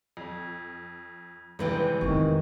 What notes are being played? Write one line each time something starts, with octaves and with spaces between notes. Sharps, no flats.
F2
G#1 C3 E3 G#3 G5
F2 D#3 B3 C#6